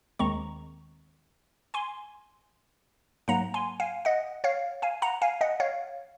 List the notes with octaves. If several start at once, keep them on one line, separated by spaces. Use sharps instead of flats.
D#2 D#3 G#3 C4 A#5 C#6
G#5 C6
G#2 F#3 A#3 F#5 A#5
G#5 C6
F5 G#5
D#5 F#5
C#5 F5
F5 G#5
F#5 A#5
F5 G#5
D#5 F#5
C#5 F5